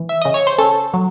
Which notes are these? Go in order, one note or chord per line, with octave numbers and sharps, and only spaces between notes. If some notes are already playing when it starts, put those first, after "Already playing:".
Already playing: E3
E5
C#3 D#5
C#5
C5
C#4 A4
F#3